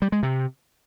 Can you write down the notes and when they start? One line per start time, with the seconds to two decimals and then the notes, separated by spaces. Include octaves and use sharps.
0.02 G3
0.12 G#3
0.23 C3